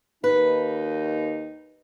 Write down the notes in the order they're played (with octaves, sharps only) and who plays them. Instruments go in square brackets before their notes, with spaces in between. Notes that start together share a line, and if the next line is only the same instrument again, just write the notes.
[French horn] D#2 [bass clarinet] D#4 [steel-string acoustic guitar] B4